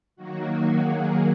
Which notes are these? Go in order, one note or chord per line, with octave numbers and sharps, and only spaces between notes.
D#3 F#3 A#3 F#4
F#4
G#4